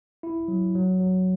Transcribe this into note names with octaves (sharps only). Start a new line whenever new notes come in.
E4
F#3
F#3
F#3